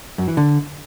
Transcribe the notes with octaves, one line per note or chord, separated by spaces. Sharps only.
F#2
E3
D3